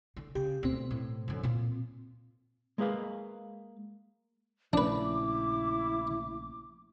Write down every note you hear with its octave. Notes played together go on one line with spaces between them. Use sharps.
D3
C#3 G4
D2 B2 C4
A2
F#2 D3
A#2 F4
G#3 A#3 G#4 B4 F5
A#1 C#3 A3 D4 E4 B4 D6